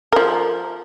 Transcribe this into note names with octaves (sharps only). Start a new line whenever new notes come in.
F3 A#4